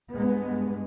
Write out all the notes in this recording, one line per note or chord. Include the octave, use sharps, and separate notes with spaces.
G2 G#3 B3